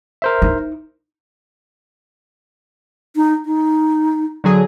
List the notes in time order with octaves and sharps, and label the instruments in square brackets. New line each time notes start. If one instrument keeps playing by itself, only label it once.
[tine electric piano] A#4 C5 E5
[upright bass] D#4
[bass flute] D#4
D#4
[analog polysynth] D3 F#3 G#4